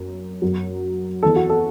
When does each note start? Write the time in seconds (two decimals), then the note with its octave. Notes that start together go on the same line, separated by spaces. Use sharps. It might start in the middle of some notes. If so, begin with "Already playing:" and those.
Already playing: F#2
0.42 F#2 F#3
1.23 E2 E3 A4
1.36 F#4
1.49 A4